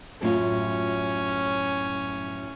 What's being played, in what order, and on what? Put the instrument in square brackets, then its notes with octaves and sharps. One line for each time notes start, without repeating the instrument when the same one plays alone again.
[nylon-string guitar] F#2 A2 F4 [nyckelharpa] C#4